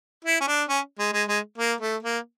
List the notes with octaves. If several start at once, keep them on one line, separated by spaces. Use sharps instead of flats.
E4
C#4
D4
C#4
G#3
G#3
G#3
A#3
A3
A#3